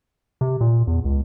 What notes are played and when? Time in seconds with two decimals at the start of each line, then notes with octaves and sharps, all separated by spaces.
0.41 C3
0.61 A#2
0.87 E2
1.05 C#2